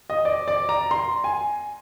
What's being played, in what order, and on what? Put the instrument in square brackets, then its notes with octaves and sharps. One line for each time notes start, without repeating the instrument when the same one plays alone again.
[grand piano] D#5
D5
D5
A#5
C6
G#5